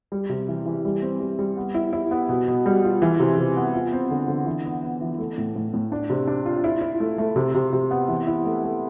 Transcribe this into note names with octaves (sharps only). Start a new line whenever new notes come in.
G3
C3
E3
E3
G3
C4
G3
G3
B3
E4
E4
B3
B2
B2
G3
F4
E3
C3
C3
B3
F4
C4
D3
D3
E3
B3
B3
E3
A3
A2
A2
A2
D4
C3
D4
F4
E4
E4
A3
A3
C3
C3
C3
B3
E3
E4
A3
A3